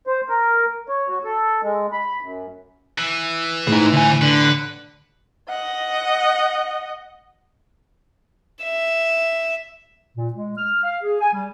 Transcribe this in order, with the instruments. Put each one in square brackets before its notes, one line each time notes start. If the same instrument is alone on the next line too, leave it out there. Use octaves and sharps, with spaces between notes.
[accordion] C5
A#4
C#5
F#4
A4
G#3
B5
F#2
[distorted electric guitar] E3
[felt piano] A2 [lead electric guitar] D#4 G#4
[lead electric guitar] D3 G#5
[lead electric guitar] D3 [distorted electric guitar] B4
[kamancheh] D#5 F#5
[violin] E5
[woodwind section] A#2
G#3
F6
F5
G#4
G#5
G3